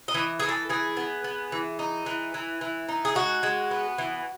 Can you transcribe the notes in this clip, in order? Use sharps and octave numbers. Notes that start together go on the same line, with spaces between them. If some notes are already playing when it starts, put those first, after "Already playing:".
D#5
E3
E3 G#4
A4
E3 G#4
B3
B3
E3
D#4
E3
E3
E3
D#4
G#4
G#3 F#4
G#3
B3
E3